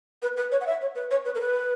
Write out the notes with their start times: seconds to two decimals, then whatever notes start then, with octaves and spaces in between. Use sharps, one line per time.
0.22 B4
0.37 B4
0.52 C#5
0.61 F#5
0.67 E5
0.81 C#5
0.95 B4
1.11 C#5
1.25 B4
1.35 A#4
1.41 B4